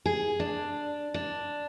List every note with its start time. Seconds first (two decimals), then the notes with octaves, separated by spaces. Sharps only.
0.06 G#4
0.40 D4
1.14 D4